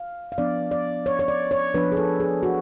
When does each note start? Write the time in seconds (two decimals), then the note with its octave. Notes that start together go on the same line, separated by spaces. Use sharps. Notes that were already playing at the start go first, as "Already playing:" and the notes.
Already playing: F5
0.32 F5
0.38 F3 B3 D4 D5
0.71 D5
1.06 C#5
1.19 C#5
1.28 D5
1.51 C#5
1.74 F3 B3 D4 B4
1.92 G#4
1.97 A4
2.20 G#4
2.43 F#4